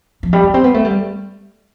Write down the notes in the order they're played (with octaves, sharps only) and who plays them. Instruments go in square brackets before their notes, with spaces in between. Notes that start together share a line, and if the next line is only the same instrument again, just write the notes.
[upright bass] F3
G3
B3
C4
B3
A3
G3